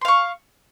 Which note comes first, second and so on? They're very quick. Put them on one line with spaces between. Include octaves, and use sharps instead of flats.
C6 F5 C#6